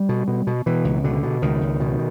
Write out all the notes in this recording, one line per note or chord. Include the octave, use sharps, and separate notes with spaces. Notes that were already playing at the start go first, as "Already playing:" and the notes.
Already playing: G3
B2
B2
B2
B2 E3
C#2
B2 D3
B2
C#2 D#3
C#2
B2